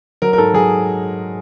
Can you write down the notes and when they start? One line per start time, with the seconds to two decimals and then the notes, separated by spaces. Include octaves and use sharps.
0.22 F#3 A#4
0.33 A#4
0.38 G#2 A4
0.54 F#3 G#4